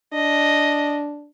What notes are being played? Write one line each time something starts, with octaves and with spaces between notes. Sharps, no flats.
D4 D#5